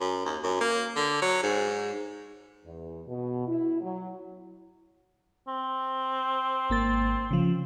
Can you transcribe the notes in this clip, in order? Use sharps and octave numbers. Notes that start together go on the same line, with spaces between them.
F#2
D#2
F#2
A#3
D3
F#3
G#2
E2
B2
E4
F#3
C4
G#1 A#3 A6
C#3 F3